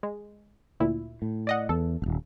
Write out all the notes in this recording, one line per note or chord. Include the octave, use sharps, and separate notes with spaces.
G#3
D2 A#2 E4
A2
D5 D#5 F#5
E2 A4
D#1 G#1